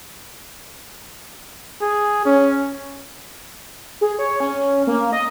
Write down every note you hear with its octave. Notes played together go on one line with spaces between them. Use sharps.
G#4
C#4
G#4
C#5
C#4
A#3
D#5